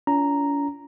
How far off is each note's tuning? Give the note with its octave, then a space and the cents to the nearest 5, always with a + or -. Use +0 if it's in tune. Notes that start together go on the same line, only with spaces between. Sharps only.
C#4 +45 F4 -30 A#5 +0